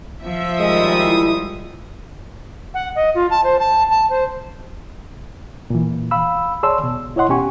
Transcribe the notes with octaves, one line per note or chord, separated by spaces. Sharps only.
F3 E5
D#3 G3 G#3 D#5 D#6
E4
F#5
D#5
F4
A5
C5
A5
A5
C5
A#2 E3
F5 B5 E6
G#4 C#5 D5 A5 C6 E6
B2
E4 C#5 D#5 F#5 C6
B2 C#4 G4 G#5 C#6